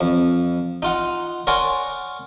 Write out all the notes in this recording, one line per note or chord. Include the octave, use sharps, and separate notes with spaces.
F2
D#4 F4 F#5
A#4 C#5 D5 F#5 G#5 C6